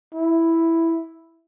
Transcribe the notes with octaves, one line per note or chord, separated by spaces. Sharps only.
E4